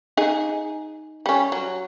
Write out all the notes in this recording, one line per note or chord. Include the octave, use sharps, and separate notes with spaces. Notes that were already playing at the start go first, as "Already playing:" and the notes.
D#4 G#4 G#5
G3 C#4
F#3